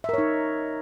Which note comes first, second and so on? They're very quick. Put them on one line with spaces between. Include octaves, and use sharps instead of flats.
E5 A#4 C#5 D#4